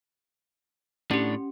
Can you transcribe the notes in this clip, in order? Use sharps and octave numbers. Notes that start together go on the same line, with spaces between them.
A2 C#4 D4 G4